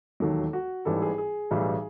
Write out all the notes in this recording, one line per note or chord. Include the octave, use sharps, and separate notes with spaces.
E1 D#2 D#3 F#3 A4
F#4
A1 G#2 E3 G3 A4
G#4
G#4
B1 A2 E3 G3